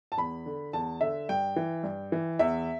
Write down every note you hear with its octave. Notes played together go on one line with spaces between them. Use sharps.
A5
E2 B5
D3
E2 A5
D3 E5
G2 G5
E3
G2
E3
E2 E5